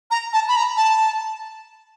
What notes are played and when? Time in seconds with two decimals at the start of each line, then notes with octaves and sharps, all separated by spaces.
0.11 A#5
0.33 A5
0.48 B5
0.56 A#5
0.77 A5